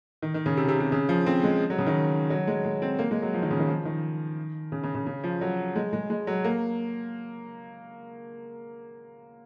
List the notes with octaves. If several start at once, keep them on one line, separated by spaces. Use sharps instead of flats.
D#3
D#3
C#3
C3
C3
C3
C#3
F3
C4
G#3
F#3
C#3
D#3
F#3
G#3
G#3
C4
A#3
G#3
F#3
F3
D#3
C#3
D#3
F3
D#3
C#3
C#3
C#3
C#3
F3
F#3
G#3
G#3
G#3
F#3
A#3